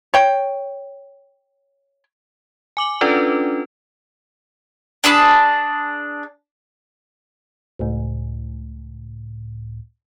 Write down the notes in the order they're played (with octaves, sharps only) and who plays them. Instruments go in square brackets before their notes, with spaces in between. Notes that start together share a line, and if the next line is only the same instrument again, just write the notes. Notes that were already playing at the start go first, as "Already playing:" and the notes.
[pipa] C#5 G5
[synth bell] G#5 D6 F#7
C#4 D4 F4 A4 B4 D5
[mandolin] D4 G#4 A5 B5
[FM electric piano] C#2 A2